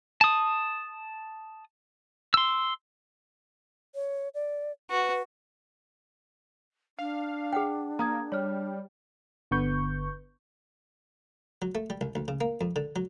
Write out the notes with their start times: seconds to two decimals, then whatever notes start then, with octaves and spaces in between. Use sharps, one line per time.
0.21 A5 D#6
2.34 C6 E6
3.95 C#5
4.34 D5
4.91 F#4 B4
6.99 D4 F5
7.53 G#4 F#5 G5
7.99 A#3 A#5 D#6 G#6
8.32 G3 C#5 F6
9.51 G1 D3 B3 B4 C#6 G6
11.62 F#3
11.75 A3
11.90 G3
12.01 C2
12.15 D2
12.28 C#3
12.41 A#3
12.61 F2
12.76 D3
12.96 F#3